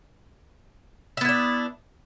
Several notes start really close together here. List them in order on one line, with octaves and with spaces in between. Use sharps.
E5 B3 E4 D4